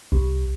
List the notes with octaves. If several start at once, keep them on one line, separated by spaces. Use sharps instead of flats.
C2